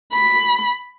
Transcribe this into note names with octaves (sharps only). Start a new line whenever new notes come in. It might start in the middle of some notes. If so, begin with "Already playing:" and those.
B5